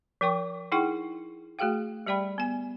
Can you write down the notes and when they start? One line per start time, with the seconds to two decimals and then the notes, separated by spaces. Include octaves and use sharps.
0.21 F3 A#4 G5 C#6 D6
0.72 D#4 E4 G#4 F#5 G5 C#6
1.59 A3 F#4 G#4 F5 G5
2.06 G3 G4 D5 G5 B5
2.38 B3 G#5